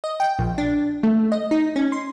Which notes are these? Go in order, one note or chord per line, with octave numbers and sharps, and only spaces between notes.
D#5
G5
A#1
D4
A3
D#5
D#4
C#4
C6